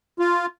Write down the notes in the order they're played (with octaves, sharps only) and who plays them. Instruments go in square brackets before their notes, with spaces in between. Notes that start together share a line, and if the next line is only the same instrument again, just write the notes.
[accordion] F4